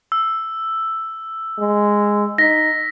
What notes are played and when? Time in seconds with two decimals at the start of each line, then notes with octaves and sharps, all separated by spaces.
0.12 E6
1.58 G#3
2.38 D#4 A#6 B6